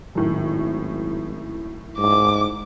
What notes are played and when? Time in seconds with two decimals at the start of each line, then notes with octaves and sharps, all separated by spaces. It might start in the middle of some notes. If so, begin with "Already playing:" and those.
0.15 G#1 F#2 A2 D#3
1.98 G#2 D6